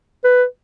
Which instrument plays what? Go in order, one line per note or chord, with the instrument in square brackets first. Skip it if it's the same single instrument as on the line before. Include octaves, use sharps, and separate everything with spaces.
[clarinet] B4